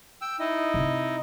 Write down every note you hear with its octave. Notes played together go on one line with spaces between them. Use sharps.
G5 E6
D#4 E4 D#5
C3